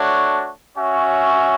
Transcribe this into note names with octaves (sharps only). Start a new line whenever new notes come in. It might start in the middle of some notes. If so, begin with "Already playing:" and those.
Already playing: A3 D4 F#4 C#5
C#4 F#4 C#5 E5